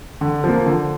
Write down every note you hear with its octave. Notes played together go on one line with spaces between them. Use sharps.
D3
F3 A#3
D3